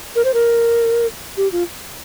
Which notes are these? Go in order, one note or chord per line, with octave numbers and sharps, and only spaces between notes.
A#4
C5
A#4
G4
F4